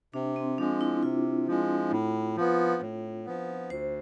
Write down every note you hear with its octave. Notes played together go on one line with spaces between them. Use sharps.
C3 D4
C4
F3 G#3 D4
E4
C3 F4
F3 G#3
A2
F3 B3
A2
F3 B3
D2 C5